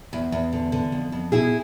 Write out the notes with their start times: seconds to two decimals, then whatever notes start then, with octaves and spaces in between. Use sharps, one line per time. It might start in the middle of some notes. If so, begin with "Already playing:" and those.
0.13 E2
0.32 E2
0.53 D3
0.72 D3
0.92 F2
1.12 F2
1.32 B2 E4 G#4